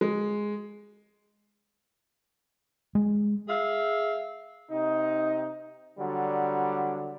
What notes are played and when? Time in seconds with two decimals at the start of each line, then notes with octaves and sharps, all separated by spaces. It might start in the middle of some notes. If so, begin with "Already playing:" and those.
0.01 G#3
2.95 G#3
3.48 G#4 E5 F5
4.71 C3 D#4
5.99 D3 F#3 G3